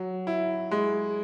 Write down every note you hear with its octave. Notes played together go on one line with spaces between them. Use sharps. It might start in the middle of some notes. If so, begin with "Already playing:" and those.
Already playing: F#3
E4
G#3